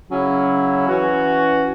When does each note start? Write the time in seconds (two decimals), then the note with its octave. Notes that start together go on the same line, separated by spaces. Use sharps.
0.11 C#3 F#3 C#4 E4
0.89 E3 C#4 F#4